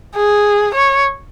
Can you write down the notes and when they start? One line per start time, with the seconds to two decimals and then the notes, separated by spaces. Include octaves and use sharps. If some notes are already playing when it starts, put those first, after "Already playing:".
0.16 G#4
0.75 C#5